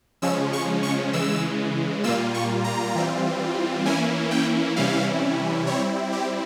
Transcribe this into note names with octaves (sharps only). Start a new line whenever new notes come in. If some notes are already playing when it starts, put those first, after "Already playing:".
C#3 F3 G#3 C#4 E6
C#6
C#6
C#3 E3 G#3 E6
A#2 G3 A#3 F4 E6
C#6
A#5
E3 G3 C4 F4
E3 A#3 C#4 E4 G#5
G5
C3 E3 G3 C#4 E4 F5
G3 C4 E4 C#5
G4